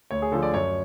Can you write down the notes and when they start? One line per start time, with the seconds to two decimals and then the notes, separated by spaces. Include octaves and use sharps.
0.11 D2 C#5
0.22 G#4
0.32 D3 F3 A4
0.42 D5
0.53 F#2 C#5